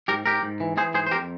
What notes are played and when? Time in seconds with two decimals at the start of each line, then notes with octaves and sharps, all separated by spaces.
0.08 G#2 G4 A#4
0.26 G#2 G4 A#4
0.43 G#2
0.60 E3
0.77 E3 G#4 C5
0.94 G#2 G#4 C5
1.06 C5
1.11 F2 G4 A#4